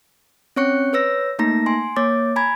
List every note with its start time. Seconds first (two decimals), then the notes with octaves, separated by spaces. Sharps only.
0.56 C4 C#4 C#5 C#6 F#6 C#7
0.93 B4 C#5 E6 A#6
1.39 A3 A#3 D#4 A#5 A#6
1.66 G#5 C6
1.96 A#3 C#5 D6 A6
2.36 G#5 A#5 B5 G#6